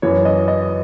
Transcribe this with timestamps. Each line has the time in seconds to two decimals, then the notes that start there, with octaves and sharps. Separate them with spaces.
0.02 F#2 E3 C#5
0.25 D#5
0.48 D#5